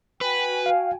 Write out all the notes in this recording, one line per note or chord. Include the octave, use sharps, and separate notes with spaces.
F#4 B4 G5 G#5
F5